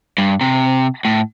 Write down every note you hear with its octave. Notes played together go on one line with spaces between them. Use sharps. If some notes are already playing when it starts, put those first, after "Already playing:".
G2
C3
A2